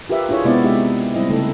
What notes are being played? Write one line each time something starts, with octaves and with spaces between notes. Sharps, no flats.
F4 G4 A#4 B4 E5
D4 E4 F4 G#4 C#5
C3 G#3 B3 C4 E4 D5
G#3 D#4 G4 E5
G3 C4 E4 D#5
C#3 A3 D#4 E4 A4